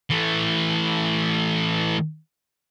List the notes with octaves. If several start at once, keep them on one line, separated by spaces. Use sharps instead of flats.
E3 A3